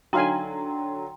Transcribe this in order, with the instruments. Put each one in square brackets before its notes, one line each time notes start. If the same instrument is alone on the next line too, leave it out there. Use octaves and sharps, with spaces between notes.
[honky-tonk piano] D3 F#3 [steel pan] D#4 F5 G#5 [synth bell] G5 A#5 C6